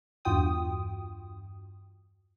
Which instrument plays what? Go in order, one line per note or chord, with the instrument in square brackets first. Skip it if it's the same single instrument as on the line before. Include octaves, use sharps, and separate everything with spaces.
[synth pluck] E2 G2 F4 F#4 G5 D#6